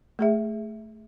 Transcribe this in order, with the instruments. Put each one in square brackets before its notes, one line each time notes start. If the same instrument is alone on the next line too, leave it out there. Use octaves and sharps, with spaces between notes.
[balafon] A3 G#4 E5